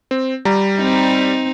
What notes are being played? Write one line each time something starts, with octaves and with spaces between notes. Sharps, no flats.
C4
G3 A#5
C4 D#4